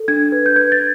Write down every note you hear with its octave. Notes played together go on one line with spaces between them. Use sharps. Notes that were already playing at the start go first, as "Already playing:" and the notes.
Already playing: A4
D4 G#6
B4
G6
B4 G#6
A6